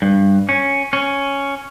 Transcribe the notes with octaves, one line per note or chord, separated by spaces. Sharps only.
G2
C#4
C#4